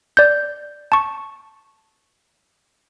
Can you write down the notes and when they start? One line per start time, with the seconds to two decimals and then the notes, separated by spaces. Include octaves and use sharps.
0.17 D5 G6
0.92 A5 C#6